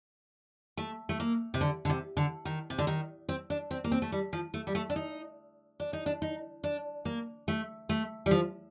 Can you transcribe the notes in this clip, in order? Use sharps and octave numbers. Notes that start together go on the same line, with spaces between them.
A3
A3
A#3
C3
D3
D3
C3
D3
D#3
C3
D3
D#3
C4
D4
C4
A#3
C4
A3
G3
F3
A3
G3
A3
D4
D#4
D4
D#4
D4
D#4
D4
A#3
A3
A3
G3
F3